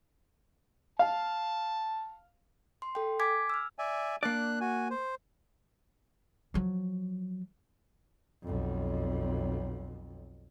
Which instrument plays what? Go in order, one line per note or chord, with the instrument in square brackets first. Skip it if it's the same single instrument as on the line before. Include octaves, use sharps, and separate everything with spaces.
[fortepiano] F5 [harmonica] A5
[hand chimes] C6
A4 G5
G#5 D6 G#6 B6
E6 F6
[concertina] D5 E5 G#5
[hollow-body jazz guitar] A#3 D5 [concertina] D4 F#6
[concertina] F#4 G#5
C5
[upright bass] F3 F#3
[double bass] B1 F2